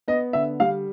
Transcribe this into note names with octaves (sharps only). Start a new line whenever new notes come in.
B3 D#5
D3 E5
G3 F5